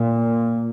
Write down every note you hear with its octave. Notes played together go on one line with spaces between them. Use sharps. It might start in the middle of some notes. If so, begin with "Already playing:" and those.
Already playing: A#2